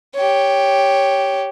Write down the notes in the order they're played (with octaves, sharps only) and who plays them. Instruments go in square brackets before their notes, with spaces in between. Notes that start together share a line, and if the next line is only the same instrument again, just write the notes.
[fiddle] G4 C#5